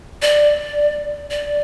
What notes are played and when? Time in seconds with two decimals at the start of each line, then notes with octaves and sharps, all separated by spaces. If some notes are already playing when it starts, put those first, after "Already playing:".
0.22 D5
1.31 D5